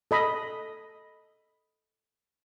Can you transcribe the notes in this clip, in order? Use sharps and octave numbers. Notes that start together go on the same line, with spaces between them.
A4 D#5 B5